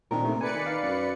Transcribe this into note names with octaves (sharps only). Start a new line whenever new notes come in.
A#2 D#3 C4 D4 A#4
C3 A3
B4 D5 G#5 C#7
D#3 B5
F5
F#2